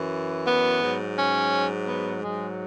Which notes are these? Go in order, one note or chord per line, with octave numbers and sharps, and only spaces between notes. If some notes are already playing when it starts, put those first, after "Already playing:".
Already playing: F#2 E3
B3
G#2 F#3
C#4
B3
G#2 F#3 G#3